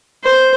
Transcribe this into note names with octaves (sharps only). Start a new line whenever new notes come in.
C5